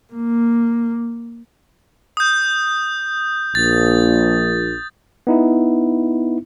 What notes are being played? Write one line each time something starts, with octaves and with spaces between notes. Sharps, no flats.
A#3
D#6 G6
A#1 A6
B3 D#4 E4